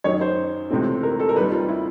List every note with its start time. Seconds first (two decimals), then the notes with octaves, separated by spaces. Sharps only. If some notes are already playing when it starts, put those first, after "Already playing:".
0.04 F#2 D#3 F#3 C#5
0.21 C5
0.70 C#2 C3 E3 A3 C4
1.03 A#4
1.20 A4
1.29 A#4
1.36 D#2 D#3 G3 C4 B4
1.52 F4
1.69 E4